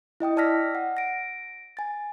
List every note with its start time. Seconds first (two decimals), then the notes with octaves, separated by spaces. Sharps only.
0.20 E4 D#5 G5 D#6
0.37 D5 A5 E6 F6 A#6 B6
0.75 F#5
0.97 A#6 D7
1.77 G#5 A6